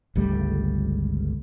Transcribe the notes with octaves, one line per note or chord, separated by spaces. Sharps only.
G1 C#2 G3 A3